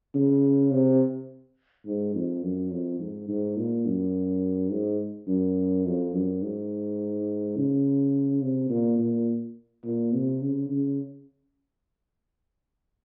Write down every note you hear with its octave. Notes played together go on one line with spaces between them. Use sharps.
C#3
C3
G#2
F2
F#2
F2
G#2
G#2
A#2
F#2
G#2
F#2
F2
F#2
G#2
C#3
C3
A#2
A#2
A#2
C3
C#3
C#3